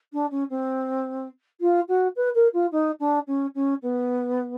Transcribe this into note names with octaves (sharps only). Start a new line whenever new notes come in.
D4
C#4
C4
F4
F#4
B4
A#4
F4
D#4
D4
C#4
C#4
B3